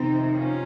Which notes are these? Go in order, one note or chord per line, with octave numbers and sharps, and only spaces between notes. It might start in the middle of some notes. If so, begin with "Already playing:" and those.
Already playing: F2 C3 D#3 C4 D#4
C#4 F4